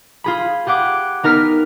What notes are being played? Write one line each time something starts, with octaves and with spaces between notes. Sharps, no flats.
F4 G#4 B5
G4 G#4 F#5 D6
B3 D#4 A#4 F6 B6